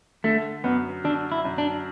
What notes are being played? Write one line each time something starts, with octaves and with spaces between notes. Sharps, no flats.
D3 A3
F#2 B3
D3 D4
E4
F#2
D4